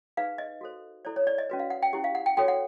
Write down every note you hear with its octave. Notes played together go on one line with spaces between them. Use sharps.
D#4 G#4 B4 F5
D#5
F#4 A4 C5
E4 A4 C5 D5
C#5
D5
D#5
C#4 F#4 B4
F5
F#5
G5
C#4 E4 G4
F5
F#5
G5
F#4 A4 C#5 G5
F#5